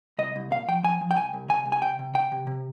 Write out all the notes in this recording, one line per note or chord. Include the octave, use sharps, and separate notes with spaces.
C2 D#5
C2
A#2 F5
F3 G5
F3 G#5
F3
G5
C2 G#5
C2
C3 G#5
C2
G#5
C3 G5
C3
C3 G5
C3
C3